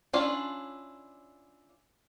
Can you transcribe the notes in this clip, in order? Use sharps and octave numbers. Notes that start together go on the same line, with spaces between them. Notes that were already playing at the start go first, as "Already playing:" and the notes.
C#4 D4 E4 F4 D5